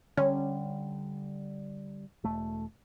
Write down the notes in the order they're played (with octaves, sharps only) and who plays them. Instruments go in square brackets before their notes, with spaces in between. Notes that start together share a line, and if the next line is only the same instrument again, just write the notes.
[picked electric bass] D3 G3 [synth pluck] C#4
[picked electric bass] E1 A3